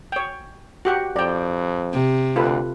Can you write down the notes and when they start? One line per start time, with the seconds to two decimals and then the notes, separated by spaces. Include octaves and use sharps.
0.12 C#5 G5
0.85 F#4 G4 F#5
1.16 F2 D5 G5
1.94 C3
2.36 D2 F4 A4 B4